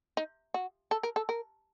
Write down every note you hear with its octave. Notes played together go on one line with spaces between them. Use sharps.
D#4
F#4
A4
A#4
A4
A#4